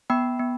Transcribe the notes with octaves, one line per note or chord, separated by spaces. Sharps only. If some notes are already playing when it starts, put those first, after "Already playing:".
B3 G5 B5
B3